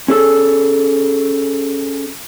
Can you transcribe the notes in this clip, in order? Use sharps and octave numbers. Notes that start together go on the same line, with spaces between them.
C#4 G#4 A4